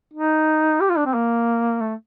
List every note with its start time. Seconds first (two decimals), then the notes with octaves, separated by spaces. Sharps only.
0.14 D#4
0.81 G4
0.89 F4
0.98 D4
1.06 C4
1.14 A#3
1.81 A3